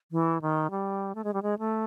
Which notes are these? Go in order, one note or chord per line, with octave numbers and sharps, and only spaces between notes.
E3
D#3
G3
A3
G#3
G3
G#3
A3